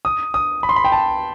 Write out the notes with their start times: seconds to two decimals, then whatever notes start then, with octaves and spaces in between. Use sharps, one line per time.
0.05 D#6
0.34 D#6
0.63 B5
0.69 C6
0.76 B5
0.84 G5
0.92 A5